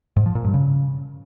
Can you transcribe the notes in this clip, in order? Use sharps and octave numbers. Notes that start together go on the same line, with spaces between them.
G#2
F3
A#2
G2
C#3